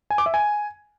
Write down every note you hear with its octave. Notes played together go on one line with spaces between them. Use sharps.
G#5
D6
E5
G#5